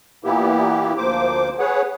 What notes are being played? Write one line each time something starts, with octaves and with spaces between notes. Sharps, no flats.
A#2 E3 A#3 B3 E4 G4
D2 F3 A#3 C5 D6
G#4 B4 C#5 F#5